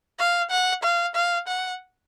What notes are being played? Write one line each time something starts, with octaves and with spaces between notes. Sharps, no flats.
F5
F#5
F5
F5
F#5